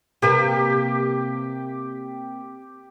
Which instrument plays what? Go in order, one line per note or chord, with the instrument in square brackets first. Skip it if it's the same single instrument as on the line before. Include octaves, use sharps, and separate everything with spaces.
[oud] C3 A#3 B4 [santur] G4